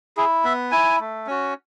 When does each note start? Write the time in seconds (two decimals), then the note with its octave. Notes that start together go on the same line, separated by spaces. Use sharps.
0.17 E4 G#4
0.44 B3 E5
0.72 E4 G#5
1.00 A3
1.27 C#4 F#4